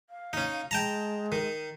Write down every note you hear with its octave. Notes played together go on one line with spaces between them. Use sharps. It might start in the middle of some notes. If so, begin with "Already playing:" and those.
F5
C#4 D#4
G#3 G5 A5 A#5
D#3